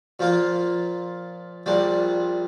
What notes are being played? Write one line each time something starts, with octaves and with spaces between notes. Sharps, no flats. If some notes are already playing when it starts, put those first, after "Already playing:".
A#2 F3 A#3 F4
A#1 A#2 G3 D4